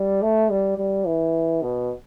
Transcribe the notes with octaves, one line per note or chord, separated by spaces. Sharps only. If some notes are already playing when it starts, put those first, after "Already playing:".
Already playing: G3
A3
G3
G3
E3
B2